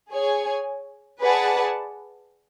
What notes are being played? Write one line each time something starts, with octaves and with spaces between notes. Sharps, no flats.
G#4 C#5 G#5
G#4 B4 D5 F#5 A5